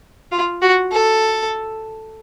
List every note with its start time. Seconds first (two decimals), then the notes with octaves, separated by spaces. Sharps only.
0.32 F4
0.62 F#4
0.92 A4